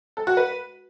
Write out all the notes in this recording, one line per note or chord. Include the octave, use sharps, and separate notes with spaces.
A4
F#4
B4